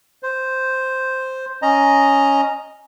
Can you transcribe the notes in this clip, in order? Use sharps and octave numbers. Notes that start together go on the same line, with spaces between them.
C5
C#4 D#5 A#5